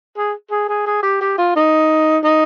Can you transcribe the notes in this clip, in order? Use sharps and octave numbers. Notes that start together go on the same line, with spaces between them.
G#4
G#4
G#4
G#4
G4
G4
F4
D#4
D#4